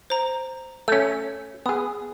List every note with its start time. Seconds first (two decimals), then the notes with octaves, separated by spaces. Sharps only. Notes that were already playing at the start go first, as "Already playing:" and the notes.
0.10 C5 A#5
0.88 A3 C#4 E6
1.66 B3 G#4 D#6